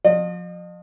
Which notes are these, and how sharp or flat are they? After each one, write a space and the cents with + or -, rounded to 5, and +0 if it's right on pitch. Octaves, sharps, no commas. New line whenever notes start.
F3 +25 D#5 -40